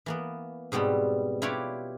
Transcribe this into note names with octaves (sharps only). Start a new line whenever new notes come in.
E3 A#3 B3
G#2 B2 G3 B3 C4
E4 F4 G4 B4 C#5 D5